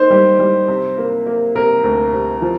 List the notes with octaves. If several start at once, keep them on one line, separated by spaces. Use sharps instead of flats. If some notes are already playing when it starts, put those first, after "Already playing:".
Already playing: A#3 D#4 C5
G3
G3
C3
A#3
A#3
C3 A#4
D2
C3
F3